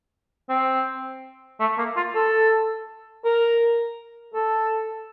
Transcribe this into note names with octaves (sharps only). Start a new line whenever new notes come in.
C4
A3
A#3
F4
A4
A#4
A4